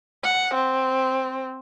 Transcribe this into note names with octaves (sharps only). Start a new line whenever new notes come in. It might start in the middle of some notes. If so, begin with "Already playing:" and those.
F#5
C4